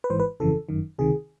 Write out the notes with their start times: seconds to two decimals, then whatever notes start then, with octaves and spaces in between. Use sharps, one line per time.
0.04 B4
0.10 G#1 G#2 E3 C5
0.20 B4
0.40 G1 F2 C#3 E3 A4
0.69 G1 F#2 D#3
0.98 C#2 C3 D#3 G#4